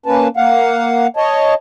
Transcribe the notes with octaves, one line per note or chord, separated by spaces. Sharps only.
A#3 C#4 B4 A5
A#3 F5 F#5
C#5 D#5 A5